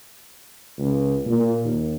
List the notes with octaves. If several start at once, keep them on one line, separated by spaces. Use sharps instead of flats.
C#2
A#2
D#2